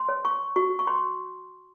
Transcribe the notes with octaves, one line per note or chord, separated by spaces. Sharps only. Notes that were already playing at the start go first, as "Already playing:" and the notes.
Already playing: C6
C#5
C#6
F#4 C#6
C#6
C6